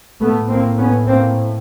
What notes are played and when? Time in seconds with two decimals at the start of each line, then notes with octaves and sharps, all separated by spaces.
0.21 A2 A3 B3
0.49 A#3 C4
0.77 B3 C#4
1.06 A#3 C4